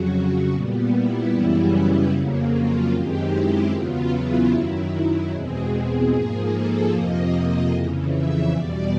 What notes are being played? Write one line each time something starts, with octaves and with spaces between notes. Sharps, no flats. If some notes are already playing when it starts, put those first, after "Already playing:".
Already playing: F2 C#3 F#3 F#4
A#2 G3 B3
E4
F#2 C#3 E3 G3 B3
F2 C#3 F#3 A#3
F4
F#2 D#3 G#3 C4 G4
E4
E2 C#3 F#3 B3 F4
E4
F#2 D#3 F#3
E2 B2 G#3 C4 G#4
G#2 F3 A#3 G#4
A4
F2 C3 F3 A#3 D#5
F2 C#3 E3
E5
E2 B2 G3 D5